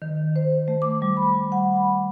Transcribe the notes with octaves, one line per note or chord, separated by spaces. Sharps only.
D#3
C5
A3
D6
G3
B5
F#5
B5